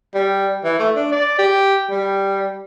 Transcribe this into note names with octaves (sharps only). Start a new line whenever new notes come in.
G3
E3
A3
D4
D5
G4
G3